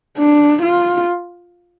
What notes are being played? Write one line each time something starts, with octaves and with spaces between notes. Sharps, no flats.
D4
F4